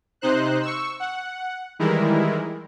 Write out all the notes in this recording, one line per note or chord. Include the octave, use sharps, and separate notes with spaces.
C3 D#4 C5 F#6
C#6 E6
F#5
D#3 E3 G3 G#3 E4 A#4